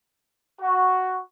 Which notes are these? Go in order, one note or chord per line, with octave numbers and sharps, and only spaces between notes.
F#4